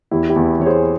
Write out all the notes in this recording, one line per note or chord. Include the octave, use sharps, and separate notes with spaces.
E2 E4 G4
E4 G4
E2
E3 C#5
G#4 C5